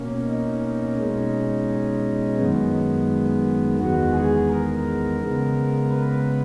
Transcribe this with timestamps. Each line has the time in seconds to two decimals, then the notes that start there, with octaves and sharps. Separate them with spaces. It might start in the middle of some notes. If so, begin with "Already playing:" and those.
Already playing: B2 A#3 C#4
0.26 D#4
0.96 B2 G#3 C#4
2.37 F#2 D#3 G#3 B3
3.78 E2 D#3 G#3 B3 F#4
4.13 G#4
4.48 A#4
5.20 C#3 G#3 B3
5.90 B4